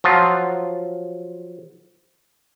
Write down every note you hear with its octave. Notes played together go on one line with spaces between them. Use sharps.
F3 F#3 F4